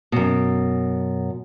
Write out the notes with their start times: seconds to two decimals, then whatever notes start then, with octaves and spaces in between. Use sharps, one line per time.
0.12 F#2 B2